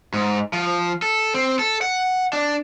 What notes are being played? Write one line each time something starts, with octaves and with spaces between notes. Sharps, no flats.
G#2
F3
A4
C4
A4
F#5
D4